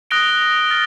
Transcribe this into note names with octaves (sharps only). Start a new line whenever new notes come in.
D#6 F#6 A#6 D7 G7
F6 A6